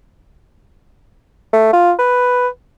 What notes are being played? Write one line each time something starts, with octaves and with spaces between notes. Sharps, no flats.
A3
F4
B4